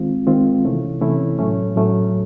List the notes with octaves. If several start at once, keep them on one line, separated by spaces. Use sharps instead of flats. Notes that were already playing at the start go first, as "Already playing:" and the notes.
Already playing: D#3 G#3 C4 F4
D#3 G#3 C4 F4
C3 E3 A3 C#4 E4
C3 E3 A3 C#4 E4
A2 F#3 A3 C#4
A2 F#3 A3 C#4